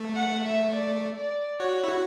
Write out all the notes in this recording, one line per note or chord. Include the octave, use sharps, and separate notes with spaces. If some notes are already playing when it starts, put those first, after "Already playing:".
Already playing: A3
F#5
E5
D5
D5
F#4 C#5
E4
F#4